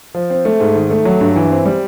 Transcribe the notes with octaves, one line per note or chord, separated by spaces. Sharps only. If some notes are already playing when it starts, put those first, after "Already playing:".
F3
C4
A3
G#2
D#3
A3
F#3
G2
E3
C4
G3